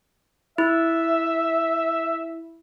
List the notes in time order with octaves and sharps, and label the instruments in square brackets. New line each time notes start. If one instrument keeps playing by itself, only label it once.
[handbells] E4 [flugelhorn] E5